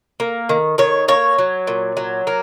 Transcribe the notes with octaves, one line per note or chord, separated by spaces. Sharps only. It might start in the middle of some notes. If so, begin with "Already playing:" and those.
A#3
D#3
D#3 C#5
A#3 C#5
F#3
A#2
F#3
A#3